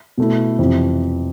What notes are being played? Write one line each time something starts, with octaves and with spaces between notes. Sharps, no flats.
B2 A3 E4
F2 C3 E3